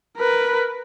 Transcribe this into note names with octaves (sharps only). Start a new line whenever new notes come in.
A#4 B4